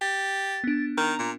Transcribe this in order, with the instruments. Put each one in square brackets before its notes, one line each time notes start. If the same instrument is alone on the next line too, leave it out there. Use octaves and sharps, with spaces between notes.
[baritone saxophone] G4 [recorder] A6
[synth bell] B3 D4
[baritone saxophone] D#3 [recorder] A#5
[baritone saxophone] A#2